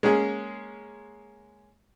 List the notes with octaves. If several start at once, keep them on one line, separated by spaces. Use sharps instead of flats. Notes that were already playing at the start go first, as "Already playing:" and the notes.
G#3 A#3 C#4 G#4